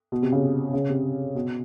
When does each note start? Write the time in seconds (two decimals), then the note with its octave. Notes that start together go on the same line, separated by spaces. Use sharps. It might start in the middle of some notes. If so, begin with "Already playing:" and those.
0.12 B2
0.22 C3
0.32 C#3
0.73 C#3
0.89 C3
1.35 B2